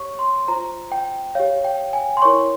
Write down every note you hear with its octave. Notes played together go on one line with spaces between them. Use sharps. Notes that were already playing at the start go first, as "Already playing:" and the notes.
Already playing: G4 C#5 C#6
C6
F4 C5 A#5
G5
G4 C#5 F5
G5
G#5
C6
E4 A#4 C#5 C#6